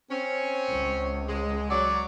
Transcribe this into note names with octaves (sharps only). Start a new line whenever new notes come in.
C4 C#4
C#2
G#3
F#3 D5